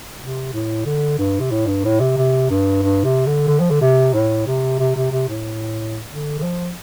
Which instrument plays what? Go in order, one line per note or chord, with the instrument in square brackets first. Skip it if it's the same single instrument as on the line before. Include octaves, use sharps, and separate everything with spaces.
[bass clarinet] C3
A2
D3
G2
C3
A2
G2
A2
C3
C3
G2
G2
C3
D3
D3
F3
D3
C3
A2
C3
C3
C3
C3
A2
D3
D3
F3